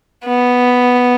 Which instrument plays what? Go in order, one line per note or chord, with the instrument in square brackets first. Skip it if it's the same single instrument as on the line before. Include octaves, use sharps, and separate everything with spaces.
[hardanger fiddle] B3